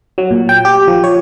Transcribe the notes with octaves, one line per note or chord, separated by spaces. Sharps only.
F#3
A#2
G5
G4
F3
C#5